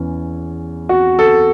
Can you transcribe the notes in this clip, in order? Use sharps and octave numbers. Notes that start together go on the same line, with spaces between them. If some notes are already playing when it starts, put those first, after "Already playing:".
Already playing: E2 E3 C#4
F#4
A4